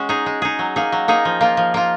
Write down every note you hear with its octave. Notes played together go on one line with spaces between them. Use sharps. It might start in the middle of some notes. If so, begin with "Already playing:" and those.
Already playing: G#3 C#4 F#4
D#4 G#4
G#3
D#4 G#4
F#3
A#3 D#4 G#4
F#3
A#3 D#4 G#4
F3
A#3 F4
F3
A#3 F4